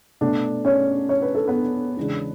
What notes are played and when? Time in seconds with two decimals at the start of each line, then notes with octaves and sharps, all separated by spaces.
0.21 B2 A3 D4 D5
0.65 C#4 C#5
1.09 C#5
1.22 B4
1.35 A4
1.48 B3 B4
1.97 E2 C#3 G#3 D4